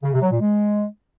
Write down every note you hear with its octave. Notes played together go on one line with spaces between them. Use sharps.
C#3
C3
F#3
A#2
G#3